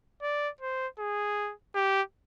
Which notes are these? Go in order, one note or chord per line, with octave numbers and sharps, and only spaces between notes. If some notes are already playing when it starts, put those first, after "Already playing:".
D5
C5
G#4
G4